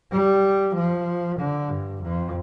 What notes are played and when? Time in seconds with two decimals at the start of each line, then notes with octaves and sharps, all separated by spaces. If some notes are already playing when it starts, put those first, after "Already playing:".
0.11 G3
0.74 F3
1.39 D3
1.69 G2
2.02 F2